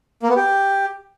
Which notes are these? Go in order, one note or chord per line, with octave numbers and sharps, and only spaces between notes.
A#3
B3
G4